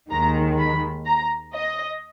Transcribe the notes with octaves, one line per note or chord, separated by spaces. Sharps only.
D#2 D#3 G#3 A#5
B5
A#5
D#5